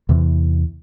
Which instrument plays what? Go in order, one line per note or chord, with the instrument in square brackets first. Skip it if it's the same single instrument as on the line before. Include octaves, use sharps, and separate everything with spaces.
[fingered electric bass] E2 C3 E3